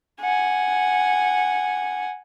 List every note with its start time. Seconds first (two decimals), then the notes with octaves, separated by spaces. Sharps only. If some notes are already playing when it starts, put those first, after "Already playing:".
0.21 F#5 G#5